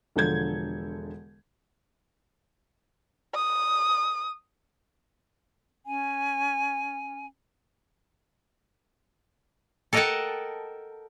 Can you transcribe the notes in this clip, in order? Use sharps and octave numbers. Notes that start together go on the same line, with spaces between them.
E1 D3 F3 A4 G6 G#6
D#6
C#4 G#5
A4 A#4 D#5 F#5 G5 A5